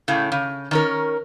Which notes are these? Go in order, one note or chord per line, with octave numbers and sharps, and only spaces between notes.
A2 C#3
C#3
D#3 C#4 A#4